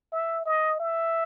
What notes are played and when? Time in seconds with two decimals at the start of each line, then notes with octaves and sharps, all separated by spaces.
0.12 E5
0.46 D#5
0.80 E5